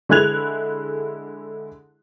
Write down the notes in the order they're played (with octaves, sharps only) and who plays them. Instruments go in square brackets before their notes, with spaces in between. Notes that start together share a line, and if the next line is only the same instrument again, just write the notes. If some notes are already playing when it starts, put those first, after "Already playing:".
[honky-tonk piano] D3 G#3 E4 F#6 G#6 F7